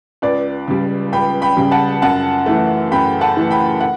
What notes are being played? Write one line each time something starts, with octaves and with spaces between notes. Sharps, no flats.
C#2 B4 D5
C#3 G3
C#2 G5 B5
G5 B5
C#3 G3
F#5 A5
F#2 F#5 A5
E3 A3
F#2 G5 B5
F#5 A5
E3 A3
G5 B5
F#5